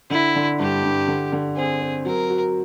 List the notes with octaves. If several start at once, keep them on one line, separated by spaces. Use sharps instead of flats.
D3 E4
D3
G2 G4
G2
D3
D3
C4 G#4
C4
F#3 A#4
F#4